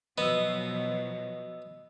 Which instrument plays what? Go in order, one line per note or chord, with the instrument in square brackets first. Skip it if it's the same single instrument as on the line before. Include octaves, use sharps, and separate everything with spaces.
[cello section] B2 F3 F#3 [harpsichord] B3 [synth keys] D#5 E6